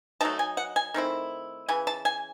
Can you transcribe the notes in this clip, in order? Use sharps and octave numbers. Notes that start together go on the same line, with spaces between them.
F#3 A3 D#4 A5
G#5
F#5
G#5
D#3 A3 C4 E4
C#3 E3 G#5
A5
G#5